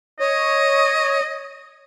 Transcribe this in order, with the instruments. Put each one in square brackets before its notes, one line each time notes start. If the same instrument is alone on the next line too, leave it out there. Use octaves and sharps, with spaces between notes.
[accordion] C#5 [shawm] D#5